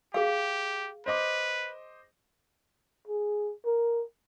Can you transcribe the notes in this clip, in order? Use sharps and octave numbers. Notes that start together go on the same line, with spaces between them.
G4 G#4 F5
B4 C5 D#5 D6
G#4
A#4